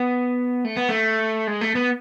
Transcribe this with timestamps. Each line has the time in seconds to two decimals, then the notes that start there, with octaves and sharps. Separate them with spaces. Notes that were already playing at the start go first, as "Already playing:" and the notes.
Already playing: B3
0.65 A3
0.77 B3
0.89 A3
1.47 G#3
1.61 A3
1.75 B3